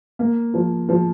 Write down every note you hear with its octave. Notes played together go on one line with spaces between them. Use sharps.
A#3
F3
F3